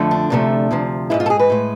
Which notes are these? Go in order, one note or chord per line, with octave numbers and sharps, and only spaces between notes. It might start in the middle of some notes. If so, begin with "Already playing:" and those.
Already playing: F2 D3 F3 A3
D4
D2 C3 F3 A3
D2 C3 F3
G#2 G#3 E4
F4
A4
G#4
B4
A2 G#3